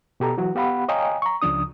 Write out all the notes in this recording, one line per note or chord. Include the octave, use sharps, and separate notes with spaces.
B2 G4 A4 A#5
E3 F#3 F#4
B3 G4 F5 F#5 B5
C#5 D#5 F5 G5 G#5 A#5
A#5 C#6
C#2 C#3 F3 D4 D#6